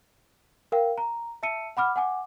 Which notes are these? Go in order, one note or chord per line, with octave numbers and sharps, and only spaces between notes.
A#4 F5 G5
A#5
E5 A5 E6 C#7 D#7
F#5 B5 D6 F6
F#5 G#5 D6